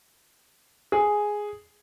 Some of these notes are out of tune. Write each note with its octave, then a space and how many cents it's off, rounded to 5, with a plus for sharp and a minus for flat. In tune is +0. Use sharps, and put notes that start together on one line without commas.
G#4 +0